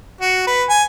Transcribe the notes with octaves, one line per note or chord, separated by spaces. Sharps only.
F#4
B4
G#5